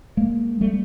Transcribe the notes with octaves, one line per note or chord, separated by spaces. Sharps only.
G#3 A#3
G3 A3